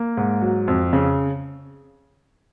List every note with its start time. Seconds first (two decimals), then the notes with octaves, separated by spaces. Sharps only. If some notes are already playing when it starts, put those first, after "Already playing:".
Already playing: A#3
0.17 G#2
0.41 F#3
0.68 F2
0.93 C#3